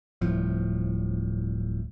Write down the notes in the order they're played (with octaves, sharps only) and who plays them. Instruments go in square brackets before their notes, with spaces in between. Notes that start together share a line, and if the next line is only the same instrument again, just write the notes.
[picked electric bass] D1 C2 A2 F3